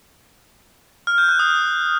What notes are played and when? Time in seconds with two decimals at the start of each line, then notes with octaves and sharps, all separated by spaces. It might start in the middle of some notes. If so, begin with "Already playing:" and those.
1.07 F6
1.18 G6
1.29 F#6
1.39 D#6